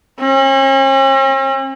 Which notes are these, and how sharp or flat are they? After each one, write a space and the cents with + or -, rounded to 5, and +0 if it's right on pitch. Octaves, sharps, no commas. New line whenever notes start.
C#4 -45